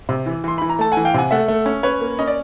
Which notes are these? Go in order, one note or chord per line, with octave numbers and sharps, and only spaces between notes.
C3
E3
E3 C6
E3 B5
A#5
A3 A5
F#5 G#5
E3
F5 G5
C3 F#5 G#5
A3 E5 F#5
A3
C#4
C#4 B4 C#5
A#3
C#4 D#5
D5